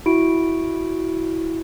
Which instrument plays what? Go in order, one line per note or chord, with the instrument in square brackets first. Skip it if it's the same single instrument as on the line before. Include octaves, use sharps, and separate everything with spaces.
[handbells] E4 F#4 D7